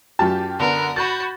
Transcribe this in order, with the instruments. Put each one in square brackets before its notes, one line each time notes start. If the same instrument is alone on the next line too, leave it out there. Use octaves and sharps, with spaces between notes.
[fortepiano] F#2 A5 [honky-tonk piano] F4 G4
[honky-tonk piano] D3 B3 [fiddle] A#4
[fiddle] F#4 [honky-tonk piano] B5 G6 A6